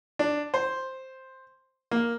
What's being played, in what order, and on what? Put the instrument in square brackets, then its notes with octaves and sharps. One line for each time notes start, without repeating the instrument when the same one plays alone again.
[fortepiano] D4
C5
A#3